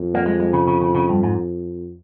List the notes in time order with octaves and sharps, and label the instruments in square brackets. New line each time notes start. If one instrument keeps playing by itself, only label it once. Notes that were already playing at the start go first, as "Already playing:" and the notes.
Already playing: [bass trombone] F2
[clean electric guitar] A#3
G#3
G#3
C#3
C#3
C#3
C#3
G2
G#2